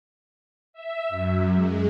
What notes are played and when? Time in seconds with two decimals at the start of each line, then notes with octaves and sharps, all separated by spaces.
0.73 E5
1.09 F#2
1.54 G#3